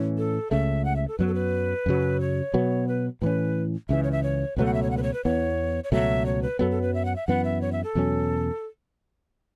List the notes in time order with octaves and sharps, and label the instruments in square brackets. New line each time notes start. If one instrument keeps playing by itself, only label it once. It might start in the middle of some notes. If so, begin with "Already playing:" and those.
Already playing: [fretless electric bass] A2 E3 C#4
[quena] A4
[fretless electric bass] C#2 C#3 A3 [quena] E5
[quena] F#5
E5
A4
[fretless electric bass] F#2 F#3 B3 [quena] B4
[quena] A4
B4
[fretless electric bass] F#2 C#3 F#3
[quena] C#5
[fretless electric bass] B2 F#3 B3
[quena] B4
[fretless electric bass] A2 E3 C#4 [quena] B4
[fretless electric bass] C#2 C#3 E3 [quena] E5
[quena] C#5
E5
C#5
[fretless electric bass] C#2 B2 F#3 A3 [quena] B4
[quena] F#5
E5
C#5
F#5
B4
C#5
B4
[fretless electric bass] E2 E3 B3 [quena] C#5
[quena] C#5
[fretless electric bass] C#2 B2 F#3 A3 [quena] E5
[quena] C#5
B4
[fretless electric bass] F#2 F#3 B3 [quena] A4
[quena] A4
B4
E5
F#5
E5
[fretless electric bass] F#2 E3 B3 [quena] F#5
[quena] E5
C#5
E5
A4
[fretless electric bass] E2 B2 F#3 C#4